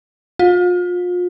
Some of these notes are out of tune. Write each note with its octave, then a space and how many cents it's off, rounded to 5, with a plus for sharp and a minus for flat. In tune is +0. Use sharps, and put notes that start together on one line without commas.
F4 +35